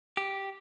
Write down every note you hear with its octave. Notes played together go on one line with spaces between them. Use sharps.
G4